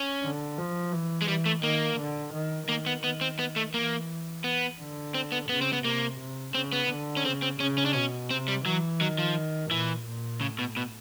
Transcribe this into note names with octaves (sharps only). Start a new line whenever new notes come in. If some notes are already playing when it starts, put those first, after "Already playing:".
Already playing: C#4
D3
F3
E3
G#3
E3 G3
A3
D#3 A#3
D3
D#3
D#3 A#3
B3
D#3 B3
C4
B3
A3
E3 A#3
B3
D3
C4
B3
C#3 B3
C4
B3
C3 A#3
C3
C#3 C4
B3
D3
C#4
C#3 C4
C4
C#3 C#4
C#4
D4
B2 C#4
C3 C4
G3
E3 F#3
D#3 F#3
F3
A#2 E3
A#2
A2 C#3
B2
B2